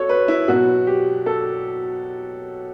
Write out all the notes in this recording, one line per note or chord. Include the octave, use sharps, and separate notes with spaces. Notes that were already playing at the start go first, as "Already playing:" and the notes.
Already playing: F#4 A4 C#5
B4
E4
B2 F#3 F#4
G4
A4